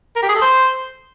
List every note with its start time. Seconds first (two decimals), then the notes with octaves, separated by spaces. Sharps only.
0.16 A#4
0.22 G4
0.29 G#4
0.35 A4
0.42 C5